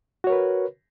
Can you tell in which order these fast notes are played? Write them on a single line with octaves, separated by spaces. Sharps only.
F#4 C#5 A#4 B4